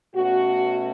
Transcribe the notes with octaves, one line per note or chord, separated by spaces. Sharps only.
B2 A3 C#4 F#4